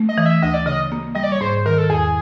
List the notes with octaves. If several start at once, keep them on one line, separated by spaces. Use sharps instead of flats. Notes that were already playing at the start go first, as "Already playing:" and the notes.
Already playing: A3
D#5
E3
E5
D2 D#5
D5
C#3 D#5
A#3
G3 D#5
D5
C#5
G#2 C5
D#3 A#4
A4
E2 G#4